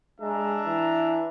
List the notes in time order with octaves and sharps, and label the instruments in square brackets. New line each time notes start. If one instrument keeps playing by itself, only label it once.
[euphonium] G#3 [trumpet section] D4 E5 A#5
[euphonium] E3